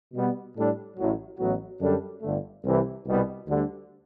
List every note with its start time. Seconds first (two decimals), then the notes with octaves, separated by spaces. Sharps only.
0.14 B2 G3 B3
0.56 A2 G3 D4 A4
0.97 A1 A2 F#3
1.39 A1 A2 F#3 B3 F#4
1.81 F#2 D3 G3 D4 A4
2.22 G1 G2 D3 A3
2.64 C2 C3 E3
3.06 C2 B2 G3 B3
3.48 D2 D3 G3